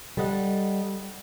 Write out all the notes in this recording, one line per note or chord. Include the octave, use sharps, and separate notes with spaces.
G3 A4 D#5 F#5